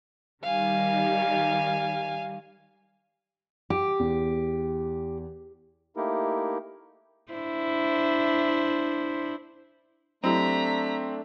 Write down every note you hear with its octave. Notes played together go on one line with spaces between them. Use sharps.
D#3 G3 F5 G#5
G4 D6
E2
A3 A#3 D#4 E4 G4 A#4
D4 E4 C5
F#3 A3 C4 D4 E4 G4 A#5 B6